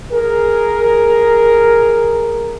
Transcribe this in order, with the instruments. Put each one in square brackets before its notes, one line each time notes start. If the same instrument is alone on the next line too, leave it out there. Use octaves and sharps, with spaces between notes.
[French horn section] G#4 A#4